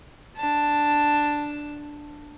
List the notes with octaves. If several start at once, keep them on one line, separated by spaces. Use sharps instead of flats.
D4 A5